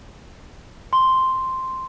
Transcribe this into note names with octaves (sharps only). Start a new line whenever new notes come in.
C6